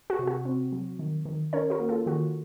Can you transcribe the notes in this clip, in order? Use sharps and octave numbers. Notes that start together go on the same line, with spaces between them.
F#4
C3
F#4
C4
F#3
D#3
D#3
C#4 A#4 C#5
F#4 A#4
A#3
F4 A4
D#3 F#4